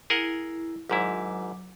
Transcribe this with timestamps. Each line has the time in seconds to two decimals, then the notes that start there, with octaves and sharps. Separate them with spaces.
0.10 E4 G#4 A#4 F#5
0.90 G#1 G#2 F#3 E4 D6